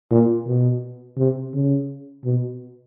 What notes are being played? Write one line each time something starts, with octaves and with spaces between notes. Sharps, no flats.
A#2
B2
C3
C#3
B2